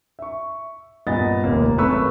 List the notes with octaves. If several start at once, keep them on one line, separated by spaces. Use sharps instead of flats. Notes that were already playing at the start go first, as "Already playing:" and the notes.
E5 C#6
G2 A#2 B3 D#5 A6
F1 D#2 A#3
G#1 F#2 A3 B4 C#6 E6